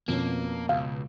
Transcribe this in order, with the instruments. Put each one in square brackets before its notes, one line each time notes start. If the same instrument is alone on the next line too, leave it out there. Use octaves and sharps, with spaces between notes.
[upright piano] F2 C#4 [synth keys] B2 [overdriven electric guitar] A#3
[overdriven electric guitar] C#2 [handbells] F5